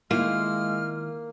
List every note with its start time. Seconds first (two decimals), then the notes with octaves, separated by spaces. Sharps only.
0.11 D#3 G#3 A#3 E4 F4 F6